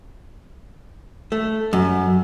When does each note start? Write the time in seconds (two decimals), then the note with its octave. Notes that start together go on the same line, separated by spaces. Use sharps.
1.32 A3
1.73 F#2